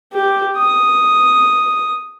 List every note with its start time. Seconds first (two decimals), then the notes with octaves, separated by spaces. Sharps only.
0.13 G4
0.57 D#6